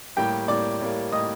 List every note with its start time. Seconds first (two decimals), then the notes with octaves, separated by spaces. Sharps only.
0.16 A2 G3 A#3 G4 G5
0.48 A2 G3 A#3 D5 D6
0.81 A2 G3 A#3
1.12 A2 G3 A#3 D#5 D#6